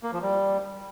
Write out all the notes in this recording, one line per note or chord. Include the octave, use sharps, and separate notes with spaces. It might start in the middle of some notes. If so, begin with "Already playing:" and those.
A#3
F3
G3